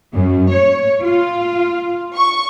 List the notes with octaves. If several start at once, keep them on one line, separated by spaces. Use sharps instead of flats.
F#2
C#5
F4
C#6